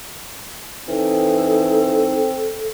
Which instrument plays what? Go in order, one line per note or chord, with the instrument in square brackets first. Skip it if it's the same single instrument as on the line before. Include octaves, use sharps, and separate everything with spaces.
[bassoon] E3 [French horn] C4 [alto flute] D#4 [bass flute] A4